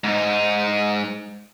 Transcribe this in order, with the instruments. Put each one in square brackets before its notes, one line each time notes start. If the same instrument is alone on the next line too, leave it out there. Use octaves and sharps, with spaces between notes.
[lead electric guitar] G#2 D#4